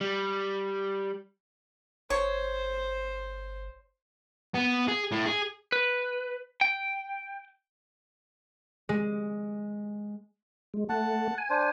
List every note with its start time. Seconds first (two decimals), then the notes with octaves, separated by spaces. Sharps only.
0.01 G3
2.10 G1 C5 C#5
4.54 B3
4.88 G#4
5.11 A2
5.26 G#4
5.72 B4
6.61 G5
8.89 G#3
10.74 G#3
10.89 A3 F#5 A5
11.38 G#5
11.50 D4 C5